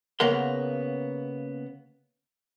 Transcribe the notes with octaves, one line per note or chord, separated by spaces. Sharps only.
C#3 A#3 B3 A#4 F#5 C6